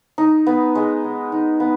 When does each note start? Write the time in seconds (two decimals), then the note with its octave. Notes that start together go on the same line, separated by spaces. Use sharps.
0.18 D#4
0.47 B3
0.75 G#3
1.04 G#3
1.32 D#4
1.60 B3